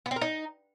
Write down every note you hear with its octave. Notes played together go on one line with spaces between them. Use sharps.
B3
C4
A#4
D#4